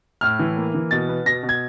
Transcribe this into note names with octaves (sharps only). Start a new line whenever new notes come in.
A2 F6
E3
A#3
E3
B2 A6
B3
B2 A#6
B2
G#6